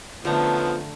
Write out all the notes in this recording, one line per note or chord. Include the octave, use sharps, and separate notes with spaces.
D3 F3 A3 B3 C#4 A#5